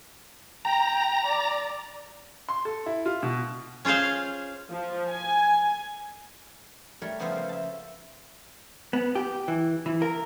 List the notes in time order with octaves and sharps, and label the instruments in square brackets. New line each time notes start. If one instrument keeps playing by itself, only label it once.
[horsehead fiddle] G5 [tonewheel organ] A#5
[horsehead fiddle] D5
[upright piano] C6
A4
E4
F4
B2
[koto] C#4 F4 G#4 C5 F5
[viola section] F3
G#5
[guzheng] G3 A3 A#4 C#5
C#3 F3 B3 C5 E5 F5
A#3
E5 A5
[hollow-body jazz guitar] B3
G4
E3
E3
A#4